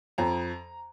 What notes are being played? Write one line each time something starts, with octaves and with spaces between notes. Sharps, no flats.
F2 A#5